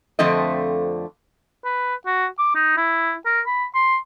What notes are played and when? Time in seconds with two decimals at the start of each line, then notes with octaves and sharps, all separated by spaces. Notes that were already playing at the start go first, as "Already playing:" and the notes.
0.19 F2 D3 F3 A3 C4 D#5
1.65 B4
2.06 F#4
2.39 D6
2.55 D#4
2.77 E4
3.26 A#4
3.47 B5
3.75 C6